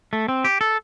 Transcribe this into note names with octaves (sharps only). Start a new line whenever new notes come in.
A3
C4
G4
A4